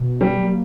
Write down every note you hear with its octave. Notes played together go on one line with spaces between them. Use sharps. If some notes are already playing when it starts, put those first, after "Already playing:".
Already playing: B2
G3
F#3 A#3